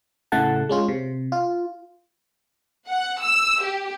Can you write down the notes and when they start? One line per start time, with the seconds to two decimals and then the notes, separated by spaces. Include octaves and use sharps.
0.32 A2 C#3 A3 F#5 A5
0.69 G#3 C#4 F4
0.88 C3
1.32 F4
2.88 F#5
3.22 E6
3.62 G4